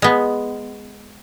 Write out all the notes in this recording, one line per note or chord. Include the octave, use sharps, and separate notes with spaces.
G#3 B3